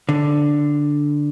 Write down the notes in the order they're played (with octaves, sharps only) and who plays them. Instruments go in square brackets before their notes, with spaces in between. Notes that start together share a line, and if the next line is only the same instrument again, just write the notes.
[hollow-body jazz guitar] D3